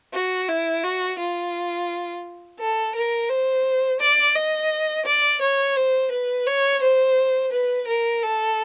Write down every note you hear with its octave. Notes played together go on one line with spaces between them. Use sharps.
F#4
E4
F#4
F4
A4
A#4
C5
D5
D#5
D5
C#5
C5
B4
C#5
C5
B4
A#4
A4